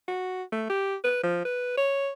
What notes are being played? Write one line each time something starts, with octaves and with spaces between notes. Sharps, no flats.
F#4
A3
G4
B4
F3
B4
C#5